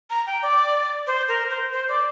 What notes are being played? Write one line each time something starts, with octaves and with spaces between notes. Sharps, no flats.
A#5
G5
D5
C5
A#4
C5
C5
D5